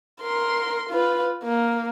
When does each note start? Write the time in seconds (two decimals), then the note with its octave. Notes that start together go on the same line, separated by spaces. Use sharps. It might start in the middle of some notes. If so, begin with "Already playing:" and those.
0.22 A#4 C6
0.90 F4 B4
1.44 A#3